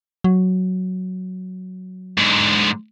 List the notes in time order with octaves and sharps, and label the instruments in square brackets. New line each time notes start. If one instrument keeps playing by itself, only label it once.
[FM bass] F#3
[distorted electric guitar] G#2 D3